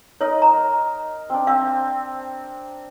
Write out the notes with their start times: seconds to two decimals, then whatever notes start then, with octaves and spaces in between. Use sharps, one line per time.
0.21 D#4 A#4 C#5 D#5
0.42 A#5
1.30 C4 D4
1.47 C4 F5